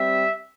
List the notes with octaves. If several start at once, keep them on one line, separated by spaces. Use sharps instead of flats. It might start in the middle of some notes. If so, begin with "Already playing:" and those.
Already playing: G3 C4 E5